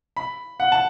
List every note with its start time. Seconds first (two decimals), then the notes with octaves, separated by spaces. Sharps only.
0.17 B5
0.60 F#5
0.72 A5